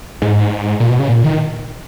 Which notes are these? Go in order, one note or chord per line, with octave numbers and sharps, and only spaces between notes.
G#2
A#2
B2
C#3
A#2
D#3